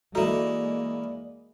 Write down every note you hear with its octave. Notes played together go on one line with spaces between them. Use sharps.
E3 G#3 A#3 D#4 F#4 A4 D5 A#5